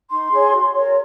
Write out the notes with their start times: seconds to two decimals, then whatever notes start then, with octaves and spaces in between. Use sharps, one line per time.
0.09 D#4 C6
0.31 G#4 C#5
0.53 F#4
0.74 A#4 C#5